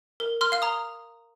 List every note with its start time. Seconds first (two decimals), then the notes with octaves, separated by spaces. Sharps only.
0.20 A#4
0.41 C6 F6
0.52 F5 F6
0.62 A#5 D#6